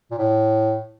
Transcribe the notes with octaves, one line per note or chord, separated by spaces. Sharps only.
A#2
A2